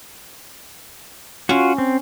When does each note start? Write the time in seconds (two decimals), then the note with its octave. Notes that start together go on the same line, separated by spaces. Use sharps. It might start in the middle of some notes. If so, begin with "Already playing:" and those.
1.49 C#4 F4 F#4
1.78 C4